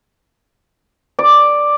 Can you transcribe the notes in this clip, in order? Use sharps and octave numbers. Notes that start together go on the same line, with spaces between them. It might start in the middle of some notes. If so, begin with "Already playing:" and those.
D5